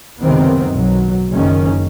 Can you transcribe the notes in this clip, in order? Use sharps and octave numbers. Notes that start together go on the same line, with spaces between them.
C#2 F#2 C3 D#3 B3 C4
B1 F#3
F#1 D#3 C#4